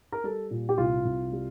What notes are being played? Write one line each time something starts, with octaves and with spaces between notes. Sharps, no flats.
A#4
G3 A4
A#2
G4
C2 F4
C2
G3